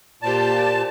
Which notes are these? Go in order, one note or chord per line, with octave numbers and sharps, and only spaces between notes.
A#2 G4 C5 D5 A5